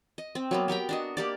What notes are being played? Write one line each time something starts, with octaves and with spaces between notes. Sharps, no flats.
D#5
C4
F#3 A#3 B3
B3 G4 A#4 G5
D4 F#4 D#5
A#3 G4 D5